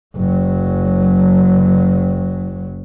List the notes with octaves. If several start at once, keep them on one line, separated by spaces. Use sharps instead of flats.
F#1 F#3